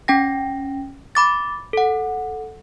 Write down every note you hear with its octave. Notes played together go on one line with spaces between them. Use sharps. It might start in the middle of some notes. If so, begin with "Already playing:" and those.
C#4 G5 A#6
B5 D6 A6
A4 F#5